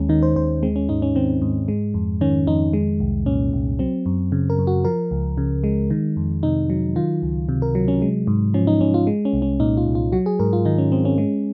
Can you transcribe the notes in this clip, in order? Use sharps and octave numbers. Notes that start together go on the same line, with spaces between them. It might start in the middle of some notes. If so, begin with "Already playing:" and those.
Already playing: D#2 G#3 C#4
D#3 D#4
C5
D#2 C5
G#3 C4
C#4
G#2 D#4
C#4
D#3 C4
G#2
G#3
F2
D#3 C#4
F2 D#4
G#3
C2
A#2 C#4
C2
F#3 C4
F#2
C#3
A#4
F#2
F#4
F3 A#4
C#2
C#3
G#3
D#3
F2
C3 D#4
F#3
D#3 F4
C#2
C3
A#4
F#3
C#4
G#3
G#2
F3 C#4
D#4
G#2 C#4
F4
G#3
C#4
C2
C#4
A#2 D#4
F4
C2
F4
F#3 F#4
G#4
G#2 A#4
F4
D#3 D#4
C#4
G#2 C4
C#4
G#3